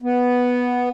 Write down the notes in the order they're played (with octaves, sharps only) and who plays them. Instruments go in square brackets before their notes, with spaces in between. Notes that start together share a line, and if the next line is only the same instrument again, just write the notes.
[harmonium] B3